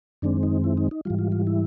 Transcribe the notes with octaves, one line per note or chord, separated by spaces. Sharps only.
F#2 D#3 G#3 C4 D4
D#4
E4
D#4
D#4
G#2 E3 G3 F4
F4
F4
E4